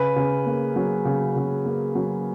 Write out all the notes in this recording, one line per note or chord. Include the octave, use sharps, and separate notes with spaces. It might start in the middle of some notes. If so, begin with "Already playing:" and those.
Already playing: C#3 B4
C#3
A#3
F#3
C#3
C#3
A#3
F#3